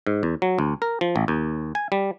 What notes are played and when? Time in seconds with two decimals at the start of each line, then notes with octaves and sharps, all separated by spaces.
0.07 G#2
0.23 E2
0.42 F#3
0.59 D2
0.82 A#4
1.01 F3
1.16 A1
1.28 D#2
1.75 G#5
1.92 G3